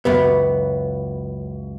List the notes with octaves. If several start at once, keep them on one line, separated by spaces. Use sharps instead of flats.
C#2 F#2 B3